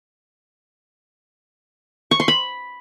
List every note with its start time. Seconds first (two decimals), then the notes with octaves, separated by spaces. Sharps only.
2.11 C#6
2.20 C6
2.28 B5